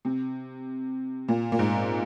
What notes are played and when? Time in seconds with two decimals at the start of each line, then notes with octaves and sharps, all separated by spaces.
0.05 C3
1.28 A#2
1.52 A#2
1.59 G#2